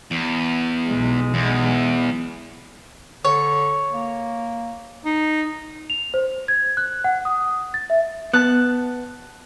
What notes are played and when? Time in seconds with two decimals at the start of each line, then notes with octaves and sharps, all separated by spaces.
0.11 E2
0.86 B1 G#3
1.34 E2
3.25 D3 C#5
3.92 A#3
5.05 D#4
5.90 F7
6.14 C5
6.48 G#6
6.77 F#6
7.04 F#5
7.25 D#6
7.74 A6
7.90 E5
8.33 B3 A5 F#6